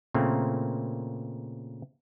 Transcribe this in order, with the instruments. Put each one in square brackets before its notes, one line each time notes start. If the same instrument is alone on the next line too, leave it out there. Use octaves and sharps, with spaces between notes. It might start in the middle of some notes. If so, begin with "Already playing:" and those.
[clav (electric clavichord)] A#2 C#3 A3 A#3 C4